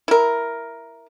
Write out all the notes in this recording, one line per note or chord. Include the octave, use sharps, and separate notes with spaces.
E4 A#4